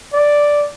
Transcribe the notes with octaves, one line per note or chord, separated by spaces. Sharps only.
D5